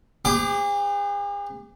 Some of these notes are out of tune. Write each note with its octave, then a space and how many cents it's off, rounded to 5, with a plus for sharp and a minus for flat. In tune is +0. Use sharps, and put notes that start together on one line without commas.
G#4 -45 C5 -35 D6 +0